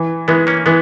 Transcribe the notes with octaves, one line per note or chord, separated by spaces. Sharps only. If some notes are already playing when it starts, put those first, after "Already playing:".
Already playing: E3
E3 G#3 B3
A#3 C#4
E3 G#3 B3